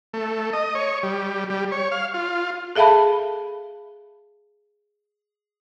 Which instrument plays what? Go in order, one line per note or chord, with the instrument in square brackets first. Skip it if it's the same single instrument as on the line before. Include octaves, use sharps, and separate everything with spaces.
[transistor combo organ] A3
D#5
C#5
G3
G3
C#5
F5
F4
[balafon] G#4 A4 E5 F5 A5 B5